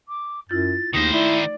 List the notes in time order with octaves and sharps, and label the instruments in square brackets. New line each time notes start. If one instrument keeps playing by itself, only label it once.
[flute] D6
[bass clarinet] F#2 [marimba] E4 F4 G6 [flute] A6
[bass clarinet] D#2 [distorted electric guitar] D#3 C5 [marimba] A3 D#4 D#6 [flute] A#6
[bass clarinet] E4 [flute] D5